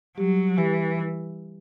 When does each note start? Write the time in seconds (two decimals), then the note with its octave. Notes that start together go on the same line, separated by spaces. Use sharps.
0.17 F#3 G3 G4
0.58 E3 G3 G4